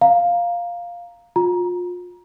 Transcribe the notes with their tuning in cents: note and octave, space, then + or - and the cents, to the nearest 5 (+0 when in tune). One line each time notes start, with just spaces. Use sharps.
F5 +0 A#5 +0
F4 +30 A#5 +20